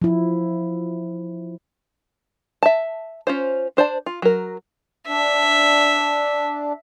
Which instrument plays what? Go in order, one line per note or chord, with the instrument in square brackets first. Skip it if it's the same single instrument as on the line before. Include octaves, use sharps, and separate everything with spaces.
[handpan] F3 E4
[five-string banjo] E5 A5
C#4 F4 C5
D4 C5 D5 A5
F4
F#3 A#4
[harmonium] D4 [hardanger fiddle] E5